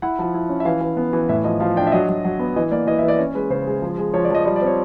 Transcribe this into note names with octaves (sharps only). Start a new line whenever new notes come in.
E4 F#5
F3
E4
C#4
E5
E3 F5
E3
B3
E3
A2 E5
F3 D#5
F3 F5
D4 G5
E5
F#3 D#5
F#3
F#3
B3
E3 D#5
A#3 D5
E3 D#5
E5
E3
D5
C#4 C#5
G#3 B4
C#3 C5
G#3
F3
G#3
F3 C#5
D5
F3 D#5
G3 D#5
D5
C4 C#5